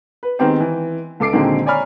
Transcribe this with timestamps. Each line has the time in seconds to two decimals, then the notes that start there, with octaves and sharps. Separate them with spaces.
0.23 B4
0.39 D#3 G#3 B3 C4 G4 C5
0.60 E3
1.20 C#2 A4 D6 C7 D7
1.33 A#2 D3 D#3 F#3 G#3 C4
1.66 C#5 D5 G#5 A#5 B5 F6